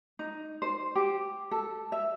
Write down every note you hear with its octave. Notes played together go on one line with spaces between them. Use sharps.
D#4
C5
G4
A4
E5